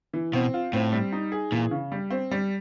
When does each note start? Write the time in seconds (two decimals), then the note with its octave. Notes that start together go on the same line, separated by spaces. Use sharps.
0.13 E3
0.33 B2 C4
0.54 F4
0.73 A2 C4
0.92 G3
1.12 D#4
1.32 G#4
1.52 A#2 E3
1.71 C#3
1.92 G3
2.10 C4
2.31 G3